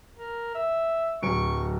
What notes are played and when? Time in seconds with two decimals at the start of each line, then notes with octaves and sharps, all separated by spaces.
0.17 A#4
0.55 E5
1.22 D1 F#3 C#6 D7